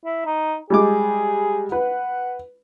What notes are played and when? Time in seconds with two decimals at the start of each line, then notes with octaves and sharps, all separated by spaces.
0.05 E4
0.26 D#4
0.70 G3 G#3 G#4 D6
1.72 B4 F#5